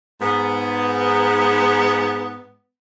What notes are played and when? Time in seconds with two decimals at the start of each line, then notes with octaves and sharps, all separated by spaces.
0.21 G#2 B3